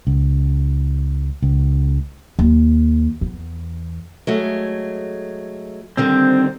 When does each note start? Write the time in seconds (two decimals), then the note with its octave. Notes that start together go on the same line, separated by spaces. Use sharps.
0.07 C#2
1.43 C#2
2.39 D#2
3.21 E2
4.27 F#3 G#3 A3
5.97 D3 D#3 G3 C4